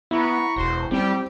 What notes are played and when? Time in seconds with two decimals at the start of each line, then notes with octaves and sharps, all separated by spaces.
0.11 B3 E4 A#5 B5 C#6
0.56 E1 F#4 C5
0.91 G3 C4 G4